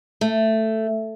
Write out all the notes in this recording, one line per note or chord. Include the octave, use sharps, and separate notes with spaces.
A3